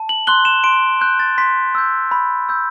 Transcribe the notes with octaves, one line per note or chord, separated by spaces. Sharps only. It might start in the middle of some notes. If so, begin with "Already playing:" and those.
Already playing: A5
F#7
C6 F#6 G7
E7
C6 D7
F#6 G6
A6
C6 B6
E6 G6
B5
E6 G6